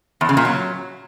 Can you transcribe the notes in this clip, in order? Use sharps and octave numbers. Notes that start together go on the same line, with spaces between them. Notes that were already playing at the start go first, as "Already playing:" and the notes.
E2
C#3
A#2
F#3